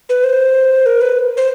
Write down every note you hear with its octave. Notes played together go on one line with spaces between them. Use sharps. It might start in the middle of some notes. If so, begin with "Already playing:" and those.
B4
C5
A#4
B4
C5